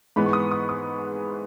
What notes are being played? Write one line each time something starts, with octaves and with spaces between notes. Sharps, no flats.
G#2 E3 G#3 B3 B5
C#6
D#6
D#6
D#6